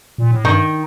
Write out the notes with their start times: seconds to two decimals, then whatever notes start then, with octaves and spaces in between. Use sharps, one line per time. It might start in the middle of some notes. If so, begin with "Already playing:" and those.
0.18 A#2
0.31 A2
0.44 G2 D#3